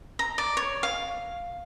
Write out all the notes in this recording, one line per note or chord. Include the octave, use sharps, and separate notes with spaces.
A#5
D5
C#5
F5